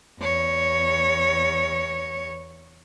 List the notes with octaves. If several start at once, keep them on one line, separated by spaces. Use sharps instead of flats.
E2 C#5